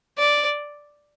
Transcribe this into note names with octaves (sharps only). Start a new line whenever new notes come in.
D5